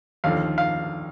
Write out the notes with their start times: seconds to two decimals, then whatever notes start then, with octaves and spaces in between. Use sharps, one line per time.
0.24 D#2 D3 F3 F5
0.58 F5